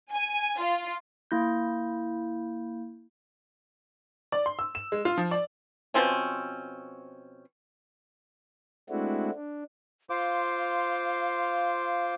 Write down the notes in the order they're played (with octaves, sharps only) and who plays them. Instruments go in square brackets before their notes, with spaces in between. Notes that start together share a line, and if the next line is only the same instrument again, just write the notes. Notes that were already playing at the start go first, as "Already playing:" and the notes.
[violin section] G#5
F4
[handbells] A#3 E4 G6
[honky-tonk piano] D5
C6
E6
E7
G#3
F4
F3
D5
[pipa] B2 F3 C4 C#4
[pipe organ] G#3 A3 C4 D4 E4 F#4
D4
[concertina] F4 C5 D6 [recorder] F5